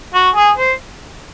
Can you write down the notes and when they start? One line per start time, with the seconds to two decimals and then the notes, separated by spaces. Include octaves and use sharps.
0.14 F#4
0.35 G#4
0.58 C5